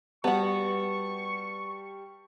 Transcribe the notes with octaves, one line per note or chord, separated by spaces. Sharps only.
G3 B3 F#4 A5 C#6